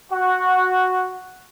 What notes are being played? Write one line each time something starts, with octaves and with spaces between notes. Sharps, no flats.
F#4